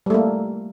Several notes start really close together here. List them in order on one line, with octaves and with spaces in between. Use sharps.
G3 A3 A#3